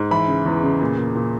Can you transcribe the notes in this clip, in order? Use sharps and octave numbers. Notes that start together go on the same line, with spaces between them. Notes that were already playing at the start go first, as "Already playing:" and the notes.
Already playing: G#2
E3 B5
C#3
E2
C#3
A#2
A#2
A#2